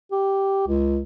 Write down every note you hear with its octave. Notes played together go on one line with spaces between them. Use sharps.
G4
C#2